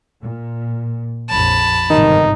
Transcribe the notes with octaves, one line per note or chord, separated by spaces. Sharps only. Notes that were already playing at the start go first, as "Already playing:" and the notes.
A#2
A#1 F2 A5 B5
G1 G#2 C3 D#3 D#4